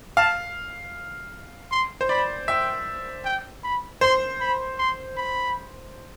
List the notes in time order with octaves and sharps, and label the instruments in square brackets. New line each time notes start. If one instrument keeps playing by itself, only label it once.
[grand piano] F5 [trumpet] A5
[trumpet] C6
[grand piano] C5
[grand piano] D5 [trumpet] B5
[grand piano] E5 [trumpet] G5
[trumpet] G5
B5
[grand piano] C5 [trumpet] C6
[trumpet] B5
C6
B5